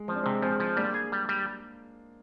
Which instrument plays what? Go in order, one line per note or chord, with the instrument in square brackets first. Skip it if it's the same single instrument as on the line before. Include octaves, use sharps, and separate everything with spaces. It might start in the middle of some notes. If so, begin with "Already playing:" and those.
Already playing: [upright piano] G#3
[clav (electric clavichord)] F3 [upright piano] C4
[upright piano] D4
[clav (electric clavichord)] C3 [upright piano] G#3 C4
[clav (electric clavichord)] F3 [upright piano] G#3 C4
[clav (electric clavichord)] F3
[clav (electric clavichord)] G3 [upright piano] A#3 D4
[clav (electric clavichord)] G#4
G3
G3